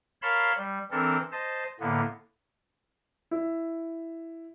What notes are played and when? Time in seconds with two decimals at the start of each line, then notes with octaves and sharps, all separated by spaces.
0.22 A#4 C#5 F5 A5 B5 C6
0.57 G3
0.91 E3 C4 D4 A4 A#4
1.32 C5 D#5 A5
1.80 A2 D3 A#3 B3
3.31 E4